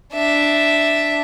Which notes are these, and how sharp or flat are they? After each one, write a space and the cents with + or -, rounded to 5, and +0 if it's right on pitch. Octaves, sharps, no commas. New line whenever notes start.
D4 +0 E5 -5